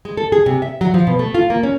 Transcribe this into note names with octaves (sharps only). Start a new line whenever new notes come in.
G#3
A4
G#4
C3
E5
F#3
F3
B2
A3
F4
A#3
C#4